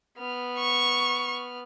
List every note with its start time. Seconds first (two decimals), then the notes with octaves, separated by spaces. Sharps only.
0.17 B3 F6
0.58 C#6